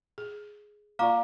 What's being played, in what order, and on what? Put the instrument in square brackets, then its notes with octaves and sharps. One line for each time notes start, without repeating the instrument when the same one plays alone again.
[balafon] G#4
[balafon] A#3 F4 D5 [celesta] F5 A#5 D6